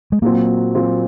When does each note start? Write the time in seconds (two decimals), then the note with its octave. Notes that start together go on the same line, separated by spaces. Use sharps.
0.12 G#3
0.22 A#2 F#3 A#3 C4
0.75 A#2 F#3 C4